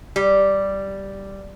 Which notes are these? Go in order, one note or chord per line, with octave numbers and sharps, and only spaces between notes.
G3